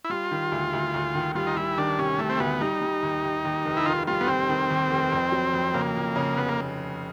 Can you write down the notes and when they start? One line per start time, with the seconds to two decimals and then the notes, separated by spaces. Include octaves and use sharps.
0.05 E4
0.10 G3 F4
0.31 D#3
0.52 D2
0.73 D2
0.94 D2
1.15 D#3
1.35 G3 F4
1.47 D#4
1.57 G3 E4
1.78 D#3 D4
1.98 C3 C#4
2.19 C3 A3
2.30 C4
2.40 D2 B3
2.61 G3 D#4
2.81 G3
3.03 D#2
3.24 D#2
3.45 D#2
3.65 F1
3.77 E4
3.86 D#3 F4
4.07 G3 F4
4.21 B3
4.28 D#2 C4
4.49 D#3
4.70 D#2
4.91 F1
5.12 F2
5.32 F#3
5.53 F2
5.74 C#3 A#3
5.96 F2
6.16 C#3
6.37 F1 B3
6.48 A#3